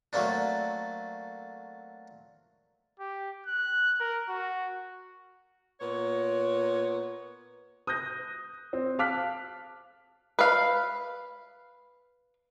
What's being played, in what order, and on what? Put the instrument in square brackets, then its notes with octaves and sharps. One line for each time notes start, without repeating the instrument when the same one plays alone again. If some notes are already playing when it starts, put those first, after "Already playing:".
[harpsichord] F#3 A3 A#3 C4 D4
[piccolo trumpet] G4
F#6
A#4
F#4
[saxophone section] A#2 B3 C#5
[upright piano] D#6 F#6 G6 A#6
C4
F5 A5 D6 F6 F#6 B6
[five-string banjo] B4 F5